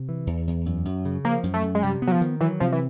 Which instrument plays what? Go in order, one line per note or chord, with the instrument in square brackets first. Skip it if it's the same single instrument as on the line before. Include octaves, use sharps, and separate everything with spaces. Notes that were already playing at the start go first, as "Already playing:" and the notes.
Already playing: [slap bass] C3
E3
E2
E2
F#2
F#2
C#3
[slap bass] F3 [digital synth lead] A#3
[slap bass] F#2
[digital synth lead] A3
[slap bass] F#2
[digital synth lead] G#3
[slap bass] C3 [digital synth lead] G3
[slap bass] B3
[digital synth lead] F#3
F3
[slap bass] D#3
[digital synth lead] E3 [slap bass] F#3
[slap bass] C3 [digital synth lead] F3
[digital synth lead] E3